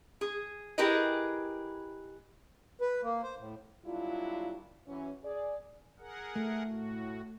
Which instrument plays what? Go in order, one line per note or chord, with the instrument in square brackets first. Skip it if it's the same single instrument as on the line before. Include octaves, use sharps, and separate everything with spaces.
[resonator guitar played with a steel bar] G#4
E4 G4 G#4 A#4 B4 D#5
[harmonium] B4
A#3
C5
A2
[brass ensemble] F#3 G3 A#3 D4 E4 F4
E3 F#3 C#4
G#4 D5
[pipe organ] G#4 A#4 F#5
[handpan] A3
[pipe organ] A2 F#4